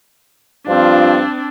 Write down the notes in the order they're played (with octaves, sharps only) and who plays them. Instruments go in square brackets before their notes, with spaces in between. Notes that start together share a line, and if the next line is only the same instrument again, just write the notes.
[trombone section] G2 F3 F4 [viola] C4 D4